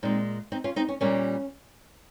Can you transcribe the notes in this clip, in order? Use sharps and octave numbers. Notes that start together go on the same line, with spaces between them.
A#2 G#3 C4 D#4
C4 D#4
C#4 F4
C4 D#4
C#4
A#2 G3 A#3 C#4